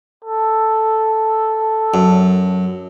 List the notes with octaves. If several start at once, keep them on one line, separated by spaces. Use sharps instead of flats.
A4
F#2